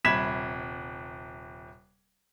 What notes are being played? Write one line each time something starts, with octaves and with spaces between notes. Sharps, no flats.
D#1 C3 B5 G#6 B6 E7